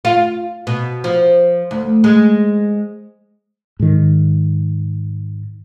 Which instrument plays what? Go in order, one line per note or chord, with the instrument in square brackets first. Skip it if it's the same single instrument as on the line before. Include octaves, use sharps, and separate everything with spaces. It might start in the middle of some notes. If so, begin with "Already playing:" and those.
[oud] F4
B2
F3
D2
G#3
[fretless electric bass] G#2 D#3